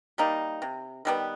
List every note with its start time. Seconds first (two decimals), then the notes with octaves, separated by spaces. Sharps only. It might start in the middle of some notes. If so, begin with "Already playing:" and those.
0.18 G3 A#3 D#4
0.62 C3
1.05 D#3 G3 B3